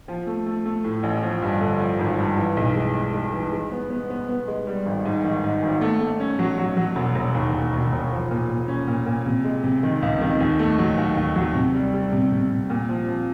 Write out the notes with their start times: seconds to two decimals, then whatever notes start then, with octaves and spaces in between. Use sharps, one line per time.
0.08 F3
0.27 A3
0.46 A3
0.65 A3
0.84 A2
1.03 A1
1.22 F3
1.42 G2
1.61 D3
1.80 F3
1.99 G#1
2.19 G2
2.37 E3
2.57 B1
2.76 G#3
2.95 G#3
3.14 G#3
3.33 E3
3.52 G#3
3.72 B3
3.90 B3
4.10 B3
4.29 B3
4.48 G#3
4.67 G3
4.86 G#1
5.05 G#2
5.24 D#3
5.44 G#2
5.63 G#1
5.81 A3
6.00 A3
6.20 C#4
6.39 F#3
6.58 F#3
6.77 F#3
6.96 E1
7.15 E1
7.35 D#2
7.54 E1
7.73 E1
7.92 E1
8.11 F3
8.31 A#2
8.49 A#2
8.68 C#4
8.88 A#2
9.06 A#2
9.26 C3
9.45 G#3
9.63 C3
9.83 D#3
10.02 C#2
10.21 D#3
10.40 D#2
10.59 A3
10.79 F#3
10.98 D#2
11.17 D#2
11.36 F#3
11.55 C3
11.74 G3
11.93 G3
12.12 C3
12.32 C3
12.51 C3
12.70 A#2
12.89 F3
13.08 F3